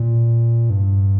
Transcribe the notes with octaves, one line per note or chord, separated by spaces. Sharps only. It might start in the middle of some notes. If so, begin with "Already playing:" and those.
Already playing: A#2
G2